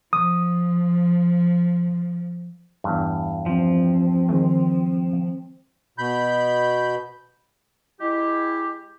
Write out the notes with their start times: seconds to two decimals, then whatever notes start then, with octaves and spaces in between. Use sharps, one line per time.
0.13 F3 D#6
2.84 E2 G2
3.46 F3 C4
4.29 D#3 G#3
5.98 B2 B5 G6
8.01 G#3 E4 G4